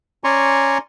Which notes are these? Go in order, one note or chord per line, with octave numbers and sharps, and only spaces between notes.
C#4 D5 G#5 A#5 C6 C#6